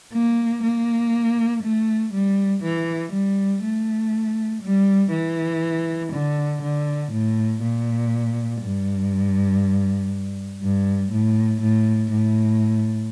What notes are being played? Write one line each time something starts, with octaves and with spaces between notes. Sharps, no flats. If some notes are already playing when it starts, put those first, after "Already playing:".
A#3
A#3
A3
G3
E3
G3
A3
G3
E3
D3
D3
A2
A#2
G2
G2
A2
A2
A2